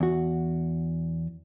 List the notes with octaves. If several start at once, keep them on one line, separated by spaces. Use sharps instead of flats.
E2 F#4